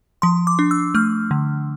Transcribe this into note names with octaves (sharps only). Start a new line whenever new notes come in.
F3 C6
D6
D4
E6
A3 F6
D3